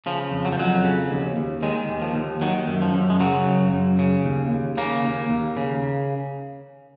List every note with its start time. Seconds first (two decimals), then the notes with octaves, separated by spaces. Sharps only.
0.06 C#3 F3
0.32 F2
0.45 F#3
0.52 F3
0.58 F2 F#3
0.84 C#3
1.10 D#2
1.37 D#2
1.63 D#3 G#3
1.89 D#2
2.02 F3
2.15 D#2
2.41 D#3 F#3
2.67 F#2
2.81 F3
2.94 F#2
3.10 G#3
3.20 C#3 F#3
3.46 F#2
3.73 F#2
3.99 C#3
4.25 D#2
4.51 D#2
4.77 C#3 A#3
5.04 D#2
5.30 D#2
5.57 C#3